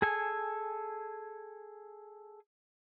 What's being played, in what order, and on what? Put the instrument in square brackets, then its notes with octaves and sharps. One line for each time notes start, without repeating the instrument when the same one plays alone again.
[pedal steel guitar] G#4 A4 G#5